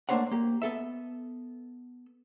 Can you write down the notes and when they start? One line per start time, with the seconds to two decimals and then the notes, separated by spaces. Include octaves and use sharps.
0.09 A3 A#3 D4 C5 C#5 F#5
0.31 A#3 G4
0.62 B3 A4 E5